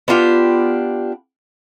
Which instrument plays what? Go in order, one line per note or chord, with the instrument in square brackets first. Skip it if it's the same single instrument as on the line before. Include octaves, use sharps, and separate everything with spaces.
[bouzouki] B3 D4 F4 G4